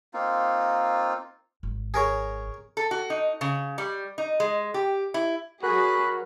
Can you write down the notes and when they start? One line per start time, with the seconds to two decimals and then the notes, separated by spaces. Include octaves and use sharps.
0.14 A#3 C4 D#4 F4
1.63 G#1
1.94 G#4 A#4 C#5
2.77 A4
2.91 F#4
3.10 D#4
3.41 C#3
3.78 G3
4.18 D#4
4.40 G#3
4.74 G4
5.14 E4
5.63 F#3 F#4 G#4 A#4 B5 F#6